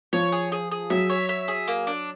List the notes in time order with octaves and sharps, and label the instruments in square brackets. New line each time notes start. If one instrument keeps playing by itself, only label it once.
[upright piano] F3 [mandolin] C#5
[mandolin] G#4
G#4
G#4
[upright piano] F#3 [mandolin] E5
[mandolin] C#5
E5
G#4
A#3
D4